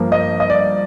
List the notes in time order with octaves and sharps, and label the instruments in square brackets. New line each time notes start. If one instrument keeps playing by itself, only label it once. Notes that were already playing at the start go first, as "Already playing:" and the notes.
Already playing: [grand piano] G2 F3 A#3
D#5
D#5
D5